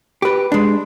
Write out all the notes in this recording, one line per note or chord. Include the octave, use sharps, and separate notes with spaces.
G4 B4
G#3 D4